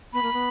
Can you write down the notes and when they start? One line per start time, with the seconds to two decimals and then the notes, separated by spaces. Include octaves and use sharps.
0.13 B3 B5
0.23 A#3
0.33 B3